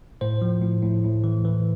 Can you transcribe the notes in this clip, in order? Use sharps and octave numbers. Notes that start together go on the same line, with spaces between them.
A2 C5
F3
A2
A2
A2
E3
E3